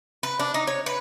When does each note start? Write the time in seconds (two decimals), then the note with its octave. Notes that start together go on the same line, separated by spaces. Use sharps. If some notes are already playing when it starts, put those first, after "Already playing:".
0.23 B4
0.39 D4
0.54 D#4
0.67 C#5
0.86 B4